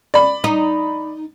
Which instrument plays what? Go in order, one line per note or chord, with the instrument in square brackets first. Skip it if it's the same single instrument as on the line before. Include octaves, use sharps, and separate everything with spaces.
[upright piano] D5 B5
[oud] D#4